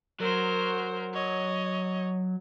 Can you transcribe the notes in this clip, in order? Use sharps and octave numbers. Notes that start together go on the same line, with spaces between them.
F#3 A#4 C5
C#5 D#5